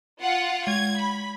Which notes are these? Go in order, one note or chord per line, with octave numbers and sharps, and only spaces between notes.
F4 F#5
G#3 G#6
B5